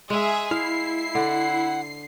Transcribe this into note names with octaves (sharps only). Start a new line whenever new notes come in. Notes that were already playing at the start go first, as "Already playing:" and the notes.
G#3 G#4 E5
E4 F5 C7
D3 F#5